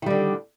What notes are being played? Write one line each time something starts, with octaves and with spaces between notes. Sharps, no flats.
D3 D#3 G3